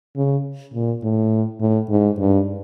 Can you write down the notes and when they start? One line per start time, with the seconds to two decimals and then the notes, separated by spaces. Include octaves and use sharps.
0.16 C#3
0.74 A#2
1.03 A2
1.61 A2
1.90 G#2
2.19 G2